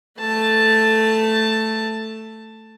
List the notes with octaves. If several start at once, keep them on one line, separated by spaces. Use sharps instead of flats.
A3 A5